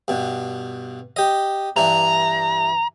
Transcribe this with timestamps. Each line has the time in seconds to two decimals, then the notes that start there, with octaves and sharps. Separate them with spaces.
0.08 G2 B2
1.16 G4 D#5
1.76 G2 E3 D4 A#5